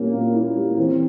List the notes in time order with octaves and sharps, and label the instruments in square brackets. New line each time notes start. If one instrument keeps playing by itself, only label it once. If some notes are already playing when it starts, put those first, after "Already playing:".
Already playing: [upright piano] A#2 G3 C#4 E4 [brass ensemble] A#3
[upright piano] A#2
[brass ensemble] A#3 [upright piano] E4
[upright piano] G3
[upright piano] E3 [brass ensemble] C4